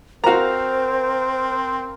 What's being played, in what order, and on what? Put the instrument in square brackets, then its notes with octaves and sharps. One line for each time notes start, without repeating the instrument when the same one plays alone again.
[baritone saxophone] C4 [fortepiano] F#4 A#5 [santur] A#4 F5 [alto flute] C5